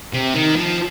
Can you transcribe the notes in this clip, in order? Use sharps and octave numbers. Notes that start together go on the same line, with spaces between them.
C3
D#3
F3